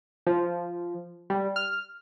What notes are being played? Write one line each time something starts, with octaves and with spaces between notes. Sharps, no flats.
F3
G3
F6